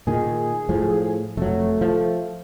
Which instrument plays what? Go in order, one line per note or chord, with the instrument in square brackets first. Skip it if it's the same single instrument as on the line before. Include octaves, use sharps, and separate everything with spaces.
[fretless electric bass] A#2 D#3 [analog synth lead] G#4
[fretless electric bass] A2 F3
[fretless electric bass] F1 F#3 [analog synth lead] A3
[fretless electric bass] F3